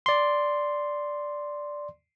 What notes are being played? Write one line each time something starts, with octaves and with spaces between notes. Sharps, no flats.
D5 C6